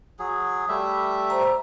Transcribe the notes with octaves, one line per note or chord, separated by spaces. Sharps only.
F#3 G#4
G3 A3 E5
C5 A#5